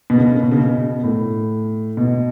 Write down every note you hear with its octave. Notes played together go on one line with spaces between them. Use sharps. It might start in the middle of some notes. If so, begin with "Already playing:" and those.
B2
C#3
B2
C#3
B2
C#3
B2
A2
B2